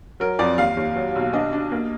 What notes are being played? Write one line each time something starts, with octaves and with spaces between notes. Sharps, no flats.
F#3 A#4
F2 D5
D#2 F5
D#2
F#3
B1
D4 D#5
D4
A#3